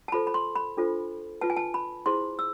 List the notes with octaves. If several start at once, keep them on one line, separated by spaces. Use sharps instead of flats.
A5
F4 A4 C5 B5
B5
C6
B5
D4 F4 A4 C5
F4 B4 A5
G#5
A5
B5
E4 G#4 C5 C6
E6